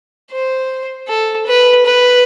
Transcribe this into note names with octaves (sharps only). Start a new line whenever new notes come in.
C5
A4
B4
B4